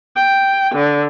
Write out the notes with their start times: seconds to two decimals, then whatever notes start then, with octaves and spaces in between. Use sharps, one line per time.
0.15 G5
0.75 D3